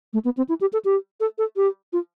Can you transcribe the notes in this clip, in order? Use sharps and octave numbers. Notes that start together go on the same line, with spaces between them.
A3
B3
C4
E4
G4
A4
G4
A4
A4
G4
F4